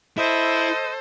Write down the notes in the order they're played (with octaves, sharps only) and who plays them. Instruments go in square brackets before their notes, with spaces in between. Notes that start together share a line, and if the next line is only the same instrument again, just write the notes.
[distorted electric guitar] E4 [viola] A4 C5 [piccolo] D#5